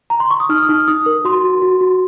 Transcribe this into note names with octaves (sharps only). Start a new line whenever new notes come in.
A#5
C6
C#6
D#6
D#4 F6
D#6
D#4 F6
D#4 D#6
A#4
F#4 C6
F#4
F#4
F#4